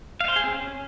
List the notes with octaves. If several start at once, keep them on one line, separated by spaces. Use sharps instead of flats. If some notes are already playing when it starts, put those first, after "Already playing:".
F5
C5
G#4
C4
C#4